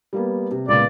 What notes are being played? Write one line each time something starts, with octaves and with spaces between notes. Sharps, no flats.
G3 A#3 B3
C3
C#2 A#2 B3 D5